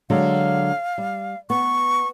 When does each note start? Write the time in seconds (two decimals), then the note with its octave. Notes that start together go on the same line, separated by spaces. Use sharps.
0.10 D3 F#3 G#3 F5
0.98 G3
1.50 B3 C#6